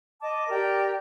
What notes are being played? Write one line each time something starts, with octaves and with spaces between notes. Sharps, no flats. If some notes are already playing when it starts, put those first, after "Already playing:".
D#5 A5 D6
G4 A#4 D5 G5